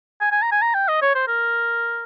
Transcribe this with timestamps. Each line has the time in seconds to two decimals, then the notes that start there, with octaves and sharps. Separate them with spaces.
0.21 G#5
0.32 G#5
0.42 A#5
0.52 G#5
0.62 A#5
0.74 G5
0.88 D#5
1.02 C#5
1.15 C5
1.28 A#4